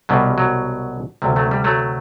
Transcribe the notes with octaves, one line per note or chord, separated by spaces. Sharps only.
C2 B2 F#3 G3
F#3
D2 C3 F#3 G3
F#3 A3
G3
F#3 A3